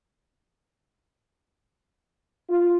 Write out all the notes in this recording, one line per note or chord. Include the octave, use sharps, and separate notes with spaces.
F4